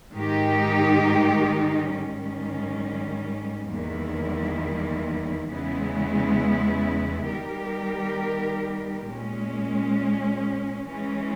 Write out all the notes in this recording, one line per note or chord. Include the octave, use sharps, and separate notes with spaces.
G#2 D#3 G#3 D#4 G4
G#2 D#3 G3 C#4
E2 D#3 G3 A#3 E4
E2 C#3 G#3 B3 E4
D#3 G3 B3 G4 A#4
A#2 G#3 C#4
E3 G#3 C#4